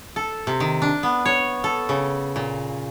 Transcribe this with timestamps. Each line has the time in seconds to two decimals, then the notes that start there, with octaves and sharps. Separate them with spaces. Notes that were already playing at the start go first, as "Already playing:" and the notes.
0.16 A4
0.47 C3
0.60 D#3
0.82 D4
1.03 B3
1.25 C#5
1.64 A4
1.89 C#3
2.36 A#2